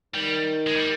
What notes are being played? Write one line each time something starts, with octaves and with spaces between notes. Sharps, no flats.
D#3 G3
G#3
G3